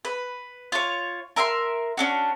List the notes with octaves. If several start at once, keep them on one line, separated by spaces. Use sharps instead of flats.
B4
F4 C#5
A#4 E5 G5 C6
C#4 D4 F#4